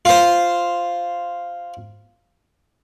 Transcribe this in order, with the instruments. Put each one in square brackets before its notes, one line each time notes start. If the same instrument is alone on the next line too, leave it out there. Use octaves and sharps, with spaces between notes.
[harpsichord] F4 C5